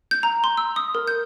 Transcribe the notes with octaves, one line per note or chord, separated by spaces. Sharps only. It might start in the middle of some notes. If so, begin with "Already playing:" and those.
G6
A#5
C6
E6
D#6
A#4
G6